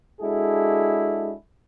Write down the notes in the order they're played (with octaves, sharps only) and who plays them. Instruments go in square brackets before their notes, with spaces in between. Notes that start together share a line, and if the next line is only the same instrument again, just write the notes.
[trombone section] G#3 D4 E4 F#4 G#4 A4